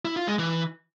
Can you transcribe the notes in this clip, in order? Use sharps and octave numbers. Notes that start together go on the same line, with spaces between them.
E4
F4
G#3
E3